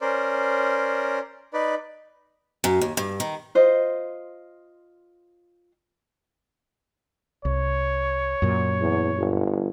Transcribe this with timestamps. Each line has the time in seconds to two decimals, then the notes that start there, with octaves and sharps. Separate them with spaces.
0.01 C#4 A#4 C5 D5
1.53 D#4 B4 D5
2.64 F#2
2.81 D#2
2.97 G2
3.20 D#3
3.55 F4 C5 D#5
7.45 C2 C#5
8.42 F#2 A#2
8.81 E2
9.17 G1